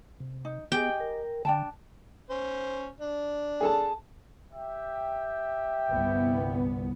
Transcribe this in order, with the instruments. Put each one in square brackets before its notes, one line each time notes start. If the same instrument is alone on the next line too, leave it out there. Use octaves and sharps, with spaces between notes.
[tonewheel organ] C3
[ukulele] D#4
[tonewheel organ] B3 [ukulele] G4 G#4 D#5 [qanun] G5
[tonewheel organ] A#4
[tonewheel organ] D3 [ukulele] D4 G5 A5
[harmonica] C#4 C5
D4
[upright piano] G#4 A4 A5
[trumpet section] G4 E5 G5
[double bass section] G1 C2 B3